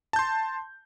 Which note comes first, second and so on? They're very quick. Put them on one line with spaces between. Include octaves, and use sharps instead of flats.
A5 G6 C6